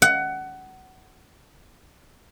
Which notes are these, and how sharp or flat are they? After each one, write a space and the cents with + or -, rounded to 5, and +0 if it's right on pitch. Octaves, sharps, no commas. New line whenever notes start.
F#5 +20